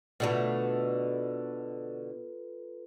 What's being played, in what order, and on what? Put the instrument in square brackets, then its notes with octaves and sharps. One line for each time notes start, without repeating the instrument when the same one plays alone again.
[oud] B2 D3 A3 [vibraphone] F4 A4 B4